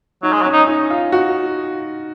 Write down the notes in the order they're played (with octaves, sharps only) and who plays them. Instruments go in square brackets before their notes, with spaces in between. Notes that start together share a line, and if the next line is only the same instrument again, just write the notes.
[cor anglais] F#3 [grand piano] D#4
[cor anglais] G#3
F#3
[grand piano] C#4
[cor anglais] D#4
[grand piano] D#4
F4
F#4